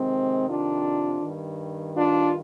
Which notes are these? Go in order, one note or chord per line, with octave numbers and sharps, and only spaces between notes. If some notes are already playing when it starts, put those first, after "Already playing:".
Already playing: F2 C3 D#3 G#3 C4
D4 F4
G2 D#3
D4 F4